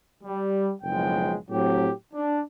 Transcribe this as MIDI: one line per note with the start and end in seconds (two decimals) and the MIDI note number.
0.24 0.73 55
0.82 1.35 30
0.82 1.35 35
0.82 1.35 53
0.82 1.35 56
0.82 1.35 79
1.50 1.90 45
1.50 1.90 54
1.50 1.90 60
1.50 1.90 67
2.14 2.40 62